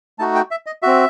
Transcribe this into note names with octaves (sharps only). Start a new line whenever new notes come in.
A3 D#4 F#4 A5
G5
E5
D#5
C4 F#4 E5